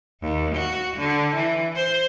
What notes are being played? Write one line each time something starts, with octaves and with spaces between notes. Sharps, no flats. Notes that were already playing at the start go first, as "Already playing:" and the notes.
D#2
F#4
D3
E3
C5